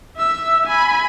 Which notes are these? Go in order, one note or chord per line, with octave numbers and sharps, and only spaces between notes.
E5 E6
G#5 B5